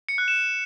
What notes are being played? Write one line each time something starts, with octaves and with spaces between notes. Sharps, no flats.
C#7
F#6
E7